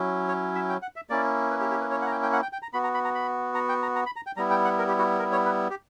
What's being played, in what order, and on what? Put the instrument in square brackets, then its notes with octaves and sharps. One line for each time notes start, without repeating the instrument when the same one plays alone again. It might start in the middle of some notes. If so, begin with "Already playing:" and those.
Already playing: [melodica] F#3 C#4 E4
C#5
E5
G5
F#5
E5
A#3 C#4 E4 D5
B4
G4
G4
B4
C#5
F#5
A#5
G5
G5
F#5
G5
G5
A#5
B3 F#4 B5
A#5
B5
A#5
B5
A#5
G5
A#5
A#5
B5
A#5
G5
G3 B3 E4 A#5
G5
F#5
A#4
G4
F#4
A#4
C#5
B4
G4